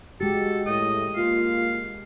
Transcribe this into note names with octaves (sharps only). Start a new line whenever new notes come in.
G#3 F#4 G4 A4
A2 D#5
A#3 F4 F5